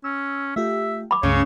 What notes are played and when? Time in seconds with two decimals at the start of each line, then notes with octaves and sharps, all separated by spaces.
0.04 C#4 E6
0.56 A3 F4 G4 E5
1.11 B5 D6
1.23 C#2 G2 C#3 A3 C#5